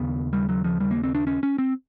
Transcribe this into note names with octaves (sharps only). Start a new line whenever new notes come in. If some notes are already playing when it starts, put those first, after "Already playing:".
Already playing: D#2 C#3 B3
G3
F#3
F3
G3
A#3
C4
D4
C#4
C#4
C4